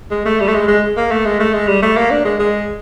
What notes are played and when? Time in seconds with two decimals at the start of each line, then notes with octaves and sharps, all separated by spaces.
0.11 G#3
0.25 A3
0.40 G3
0.48 A3
0.54 G#3
0.68 G#3
0.97 A#3
1.11 A3
1.25 G#3
1.40 A3
1.53 G#3
1.67 G3
1.82 A3
1.97 A#3
2.11 D4
2.25 G#3
2.39 G#3